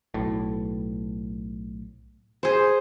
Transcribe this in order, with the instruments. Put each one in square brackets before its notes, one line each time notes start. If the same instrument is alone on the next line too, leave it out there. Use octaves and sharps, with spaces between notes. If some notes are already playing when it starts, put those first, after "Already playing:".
[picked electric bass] B1 A2
[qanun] G#4 C5